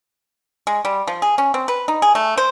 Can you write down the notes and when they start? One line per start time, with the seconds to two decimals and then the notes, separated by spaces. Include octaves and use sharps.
0.67 G#3
0.85 G3
1.07 F3
1.22 G#4
1.38 C#4
1.54 C4
1.68 B4
1.88 D#4
2.02 G#4
2.15 A3
2.37 C5